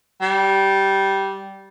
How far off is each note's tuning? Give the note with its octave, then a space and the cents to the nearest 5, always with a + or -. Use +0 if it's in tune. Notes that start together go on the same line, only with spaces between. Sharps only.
G3 -15